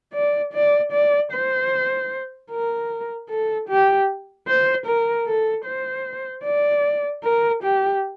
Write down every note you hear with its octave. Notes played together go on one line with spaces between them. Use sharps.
D5
D5
D5
C5
A#4
A4
G4
C5
A#4
A4
C5
D5
A#4
G4